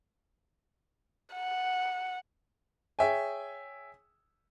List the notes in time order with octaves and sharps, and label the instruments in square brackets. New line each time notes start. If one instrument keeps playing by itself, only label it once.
[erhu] F#5
[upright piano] G#4 C#5 E5 G5 G#5